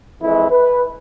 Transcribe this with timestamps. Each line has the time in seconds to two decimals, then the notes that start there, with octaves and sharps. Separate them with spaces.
0.21 F2 E3 G#3 E4
0.51 B4